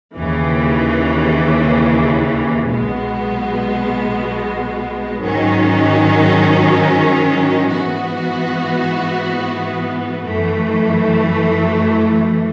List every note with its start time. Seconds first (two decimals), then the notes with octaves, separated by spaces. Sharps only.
0.17 D#2 C#3 E3
2.68 B1 B2 G#3 B3
5.20 G#2 D#3 F#3 C#4
7.71 G#2 E3 B3 F#4
10.23 F#2 E3 A3